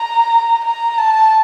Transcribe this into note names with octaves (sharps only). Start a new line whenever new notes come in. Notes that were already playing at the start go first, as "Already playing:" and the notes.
Already playing: A#5
A#5
A5